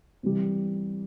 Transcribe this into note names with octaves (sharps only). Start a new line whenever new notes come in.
C3 E3 G3